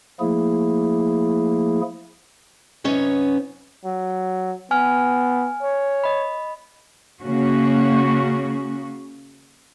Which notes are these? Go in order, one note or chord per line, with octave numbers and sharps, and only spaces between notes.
F3 A3 A#3 E4 G#4
F#2 C3 B3 C#4 D#4 C#5
F#3
B3 G#5 F6
C#5
D#5 B5
C#3 A#3 C#4 F#4